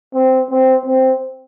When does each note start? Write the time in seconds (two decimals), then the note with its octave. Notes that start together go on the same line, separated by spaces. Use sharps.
0.14 C4
0.50 C4
0.86 C4